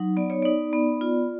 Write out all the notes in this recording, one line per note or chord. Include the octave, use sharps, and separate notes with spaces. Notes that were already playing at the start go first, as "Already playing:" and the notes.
Already playing: F#3 D#4
B3 D5
C#5
D#4 D5
B3
F4